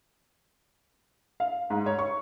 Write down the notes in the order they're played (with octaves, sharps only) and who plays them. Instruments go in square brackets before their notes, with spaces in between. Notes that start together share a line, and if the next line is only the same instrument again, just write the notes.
[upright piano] F5
G#2
C#5
C#6